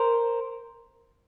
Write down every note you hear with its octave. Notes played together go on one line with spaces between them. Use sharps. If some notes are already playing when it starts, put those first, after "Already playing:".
Already playing: A#4 C5